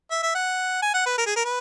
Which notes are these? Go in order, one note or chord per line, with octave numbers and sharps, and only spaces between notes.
E5
E5
F#5
G#5
F#5
B4
A#4
G#4
A#4
B4